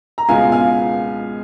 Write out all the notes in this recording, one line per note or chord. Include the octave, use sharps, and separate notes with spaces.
A#5
C#2 B2 G#3 B3 F4 F5 G#5
F5 G#5